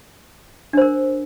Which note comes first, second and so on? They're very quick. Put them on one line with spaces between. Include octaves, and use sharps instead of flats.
D4 C5 A#4